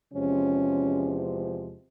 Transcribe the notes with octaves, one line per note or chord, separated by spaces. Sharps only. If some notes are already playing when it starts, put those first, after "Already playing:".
E2 C3 F3 G#3 C#4